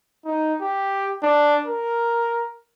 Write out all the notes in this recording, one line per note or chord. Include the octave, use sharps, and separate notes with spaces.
D#4
G4
D4
A#4